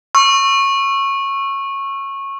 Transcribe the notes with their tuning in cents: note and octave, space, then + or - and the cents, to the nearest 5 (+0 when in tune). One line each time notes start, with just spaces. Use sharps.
C#6 -15 E6 +15